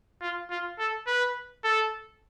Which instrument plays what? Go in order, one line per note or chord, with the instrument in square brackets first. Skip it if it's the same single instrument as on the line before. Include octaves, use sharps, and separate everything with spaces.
[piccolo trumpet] F4
F4
A4
B4
A4